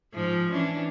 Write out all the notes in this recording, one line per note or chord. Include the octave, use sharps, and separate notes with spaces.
G#2 F3 F4
E3 C#4 D4